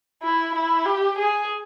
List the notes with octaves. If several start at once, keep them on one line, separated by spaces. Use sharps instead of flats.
E4
E4
G4
G#4